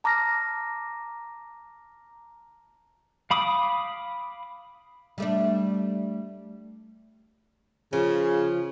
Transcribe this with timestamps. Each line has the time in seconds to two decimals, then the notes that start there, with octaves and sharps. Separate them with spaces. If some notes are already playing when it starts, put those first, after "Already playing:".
0.04 A5 A#5 D6 F6 A#6
3.31 F5 B5 D6 D#6
5.18 G3 A3 D4
7.93 C#3 F3